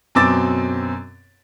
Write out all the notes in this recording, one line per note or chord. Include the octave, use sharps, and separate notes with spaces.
F#2 B2 C4 D6 E6 A6